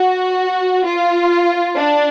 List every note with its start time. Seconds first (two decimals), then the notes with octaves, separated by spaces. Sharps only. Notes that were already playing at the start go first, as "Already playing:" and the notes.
Already playing: F#4
0.85 F4
1.76 D4